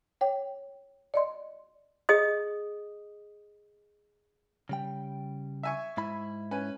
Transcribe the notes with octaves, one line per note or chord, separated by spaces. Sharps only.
C#5 G5
D5 D#5 C6
G#4 D#5 D#6
C#3 G3 G5
E5 G#5 C#6
G#2 E4 B5
C#4 B4 G#5